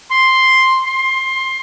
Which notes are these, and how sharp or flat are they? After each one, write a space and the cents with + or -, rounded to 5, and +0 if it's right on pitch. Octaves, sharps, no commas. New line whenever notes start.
C6 +5
C6 +20